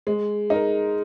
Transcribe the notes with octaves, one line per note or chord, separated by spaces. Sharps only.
G#3
D#4 A#4